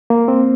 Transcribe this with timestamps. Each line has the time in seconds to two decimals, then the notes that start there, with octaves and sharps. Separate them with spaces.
0.10 A#3
0.28 C4